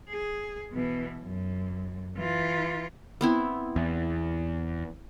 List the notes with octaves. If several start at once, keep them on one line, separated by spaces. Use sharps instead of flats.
G#4
B2 E3
F#2
E3 F4
B3 C4 E4
E2